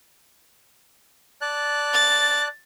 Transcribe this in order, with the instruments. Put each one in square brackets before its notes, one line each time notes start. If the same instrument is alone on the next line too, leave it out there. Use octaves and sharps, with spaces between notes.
[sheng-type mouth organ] D5 A5 F#6
[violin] A6